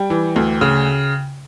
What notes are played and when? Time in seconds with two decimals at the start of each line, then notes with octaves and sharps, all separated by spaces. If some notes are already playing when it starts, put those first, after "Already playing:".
Already playing: G3 G5
0.10 E3
0.36 D2
0.61 C#3